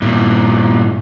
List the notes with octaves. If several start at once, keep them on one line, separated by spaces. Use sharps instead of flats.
G2 A#2